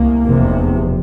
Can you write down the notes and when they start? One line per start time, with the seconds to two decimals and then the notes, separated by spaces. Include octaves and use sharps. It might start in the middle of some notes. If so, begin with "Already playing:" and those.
Already playing: C2 A#3
0.26 F1 E2 C3